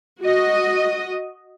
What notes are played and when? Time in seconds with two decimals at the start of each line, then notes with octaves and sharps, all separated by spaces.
0.21 F#4 D#5